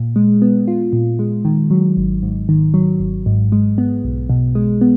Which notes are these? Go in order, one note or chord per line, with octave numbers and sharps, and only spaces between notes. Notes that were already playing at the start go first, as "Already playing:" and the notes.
Already playing: A#2
G#3
B3
F4
A#2
G#3
D#3
F#3
G#1
G#2
D#3
F#3
G#1
G#2
G#3
B3
B1
B2
G#3
B3